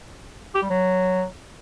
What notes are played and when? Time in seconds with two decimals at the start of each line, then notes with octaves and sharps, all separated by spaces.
0.55 G4
0.62 G3
0.70 F#3